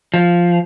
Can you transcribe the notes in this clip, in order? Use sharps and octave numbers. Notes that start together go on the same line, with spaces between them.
F3